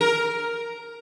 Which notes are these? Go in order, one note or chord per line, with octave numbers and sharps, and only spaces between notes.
A#4